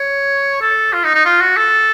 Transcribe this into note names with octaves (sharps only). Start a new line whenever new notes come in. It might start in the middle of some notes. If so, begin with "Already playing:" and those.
Already playing: C#5
A4
F4
D#4
D#4
F4
F#4
A4